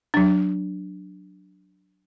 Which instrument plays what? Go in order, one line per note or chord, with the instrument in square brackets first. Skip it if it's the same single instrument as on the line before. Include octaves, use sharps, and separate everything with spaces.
[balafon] F#3 D4